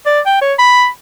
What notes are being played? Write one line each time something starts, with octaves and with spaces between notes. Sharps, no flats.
D5
G5
C#5
B5